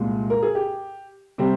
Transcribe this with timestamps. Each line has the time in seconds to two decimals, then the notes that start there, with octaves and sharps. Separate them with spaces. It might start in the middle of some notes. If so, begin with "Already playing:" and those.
Already playing: C2 A#2 G#3
0.30 A#4
0.43 G#4
0.55 G4
1.38 C3 G3 C4